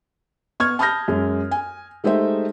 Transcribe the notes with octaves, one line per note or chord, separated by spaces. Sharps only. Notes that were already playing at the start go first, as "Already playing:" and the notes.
B3 C#6 F6 G#6
A5 B5 D#6 F6 G6 A#6
F#2 G#3
G#5
G#3 A3 D#4 G4 C5 E5